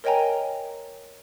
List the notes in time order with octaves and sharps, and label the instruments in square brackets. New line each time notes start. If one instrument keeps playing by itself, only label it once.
[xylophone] A#4 C#5 D#5 G5 G#5 A#5